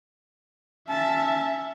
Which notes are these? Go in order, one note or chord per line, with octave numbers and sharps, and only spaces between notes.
C#4 E5 A5